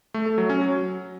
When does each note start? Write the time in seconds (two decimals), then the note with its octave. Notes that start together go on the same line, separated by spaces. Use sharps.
0.14 A3
0.26 A4
0.38 F#3
0.49 C#4
0.61 F#3